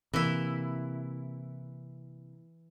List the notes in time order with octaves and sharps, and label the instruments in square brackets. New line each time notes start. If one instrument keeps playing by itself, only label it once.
[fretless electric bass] C3 A#3 [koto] E3 E4